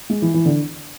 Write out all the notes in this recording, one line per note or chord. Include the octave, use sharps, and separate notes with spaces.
G#3
E3
E3
D3